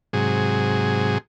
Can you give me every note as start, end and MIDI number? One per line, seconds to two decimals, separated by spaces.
0.13 1.18 44
0.13 1.18 48
0.13 1.18 54
0.13 1.18 68